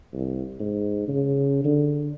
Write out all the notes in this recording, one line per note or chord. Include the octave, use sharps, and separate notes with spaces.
C2
G#2
C#3
D3